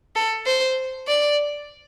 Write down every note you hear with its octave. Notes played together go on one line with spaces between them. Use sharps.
A4
C5
D5